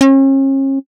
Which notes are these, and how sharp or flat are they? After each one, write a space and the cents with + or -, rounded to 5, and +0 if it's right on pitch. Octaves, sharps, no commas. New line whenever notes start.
C#4 -40